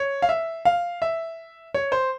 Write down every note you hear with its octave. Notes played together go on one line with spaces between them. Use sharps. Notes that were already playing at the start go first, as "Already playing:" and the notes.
Already playing: C#5
F5
E5
F5
E5
C#5
C5